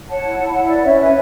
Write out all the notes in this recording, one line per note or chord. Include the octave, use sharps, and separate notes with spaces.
C#5 F#5 A5
E4
E4
B5
E4 F#5 A5
B4 D5
C#4 C#5 E5
B4 E5 G#5